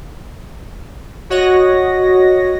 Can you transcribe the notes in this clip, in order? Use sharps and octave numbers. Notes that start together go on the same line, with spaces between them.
F#4 C#5 D#5 F#5 A#6